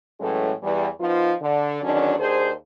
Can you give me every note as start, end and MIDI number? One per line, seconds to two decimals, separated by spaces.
0.20 0.51 45
0.20 0.51 52
0.20 0.51 54
0.20 0.51 56
0.20 0.51 61
0.20 0.51 69
0.62 0.87 40
0.62 0.87 52
0.62 0.87 55
1.00 1.32 53
1.00 1.32 59
1.00 1.32 63
1.00 1.32 65
1.42 1.82 50
1.83 2.13 40
1.83 2.13 50
1.83 2.13 51
1.83 2.13 54
1.83 2.13 61
1.83 2.13 62
2.18 2.51 39
2.18 2.51 62
2.18 2.51 68
2.18 2.51 72